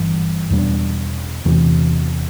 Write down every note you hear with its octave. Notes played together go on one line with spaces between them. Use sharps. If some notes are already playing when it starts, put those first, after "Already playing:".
Already playing: G1 G2 E3
E2 B2 G3 D4
E2 C3 E3